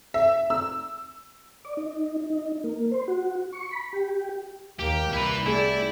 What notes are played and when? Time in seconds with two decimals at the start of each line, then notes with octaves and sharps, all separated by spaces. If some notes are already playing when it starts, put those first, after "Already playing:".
0.14 E5
0.50 E6
1.65 D5
1.77 D#4
2.30 D#4
2.64 A#3
2.91 C5
3.08 F#4
3.52 C#6
3.71 B5
3.93 G4
4.79 D#2 A#3 G4
5.13 C2 E4 B4 B5
5.46 A3 E4 G4 G#4 D5